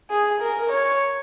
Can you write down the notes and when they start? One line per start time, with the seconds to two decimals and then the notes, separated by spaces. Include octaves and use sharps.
0.10 G#4
0.41 A#4
0.70 C#5